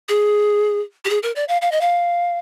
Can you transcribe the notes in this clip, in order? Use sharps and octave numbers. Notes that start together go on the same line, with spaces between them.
G#4
G4
G#4
A#4
D5
F5
F5
D#5
F5